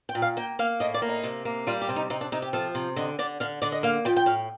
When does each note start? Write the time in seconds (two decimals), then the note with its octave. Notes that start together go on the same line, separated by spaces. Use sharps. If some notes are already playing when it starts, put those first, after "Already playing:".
0.09 G5
0.15 A#2
0.22 F5
0.37 A#3 G5
0.59 A#3 F5
0.80 A2 D#5
0.94 D5
1.02 A#3
1.09 D#4
1.24 C3
1.45 A#3
1.67 G3 F4
1.82 G4
1.89 C3
1.96 D#4
2.10 C3 D#4
2.21 D4
2.32 C3 D#4
2.42 G4
2.53 F3 A4
2.75 C3
2.96 D3 D#5
3.19 D3 D5
3.40 D3 F5
3.62 D3 D5
3.72 D#5
3.83 A#3 F5
4.05 F3 G5
4.17 G5
4.26 A2 F5